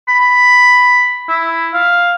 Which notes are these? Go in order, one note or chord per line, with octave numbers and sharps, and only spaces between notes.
B5
E4
F5